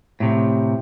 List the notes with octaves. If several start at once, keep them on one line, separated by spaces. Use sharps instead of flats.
A2 C3